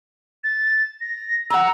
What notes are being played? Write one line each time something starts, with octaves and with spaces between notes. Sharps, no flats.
A6
A#6
F#5 A#5 E6